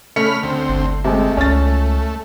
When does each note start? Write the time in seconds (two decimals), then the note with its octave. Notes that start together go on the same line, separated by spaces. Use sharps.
0.16 C#3 A3 B5 F6 C#7
0.43 D2 C4
0.69 G1
1.05 C3 G#3 A3
1.37 C#2 C#4 A6